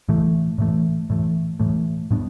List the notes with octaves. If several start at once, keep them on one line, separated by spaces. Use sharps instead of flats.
A2 E3 A3
A2 E3 A3
A2 E3 A3
A2 E3 A3
A2 G3 B3 D4